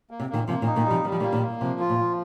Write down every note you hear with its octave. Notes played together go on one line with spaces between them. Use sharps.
A#3
C3
A#2 D#3 A#3
C3 F3 A#3
A#2 D#3
D#4
A#2 D#3
G3
C3 F3
D#3 G3
F3
A#2 D#3 A#3
A#2 D#3
A#3
C3 F3
F4
A#2
F3